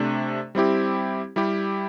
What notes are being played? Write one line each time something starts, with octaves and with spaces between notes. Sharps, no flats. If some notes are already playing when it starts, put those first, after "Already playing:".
Already playing: C3 A3 D4
G3 C4 E4 G4
G3 E4 G4